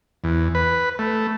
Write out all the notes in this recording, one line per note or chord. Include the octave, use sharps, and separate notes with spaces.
E2
B4
A3